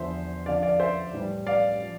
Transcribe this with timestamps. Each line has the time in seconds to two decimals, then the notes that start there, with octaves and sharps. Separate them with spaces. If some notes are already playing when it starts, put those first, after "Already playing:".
Already playing: E2 D3 F3 C5 E5
0.46 F2 D3 F3 D5 F5
0.63 D5 F5
0.80 C5 E5
1.13 A2 E3 G3
1.47 D5 F5
1.83 F3